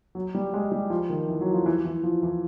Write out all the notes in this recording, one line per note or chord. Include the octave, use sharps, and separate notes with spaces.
F#3
G3
G#3
G3
F3
D#3
E3
F#3
F3
E3
E3
F3
E3